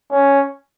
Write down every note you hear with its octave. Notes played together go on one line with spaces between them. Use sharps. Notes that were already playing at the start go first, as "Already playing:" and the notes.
C#4